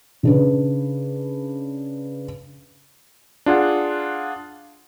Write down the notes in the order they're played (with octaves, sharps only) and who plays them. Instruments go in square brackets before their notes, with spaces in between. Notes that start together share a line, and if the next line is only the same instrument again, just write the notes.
[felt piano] C#3 D4 B4
[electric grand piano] D4 F4 G#4 F#5